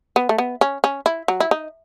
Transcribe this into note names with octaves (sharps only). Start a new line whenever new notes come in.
B3
A3
B3
C#4
C#4
E4
F#3
E4
D#4